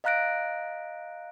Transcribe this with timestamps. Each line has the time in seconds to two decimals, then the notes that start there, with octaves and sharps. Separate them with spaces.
0.04 D#5 F5 A#5 F#6 A#6 D7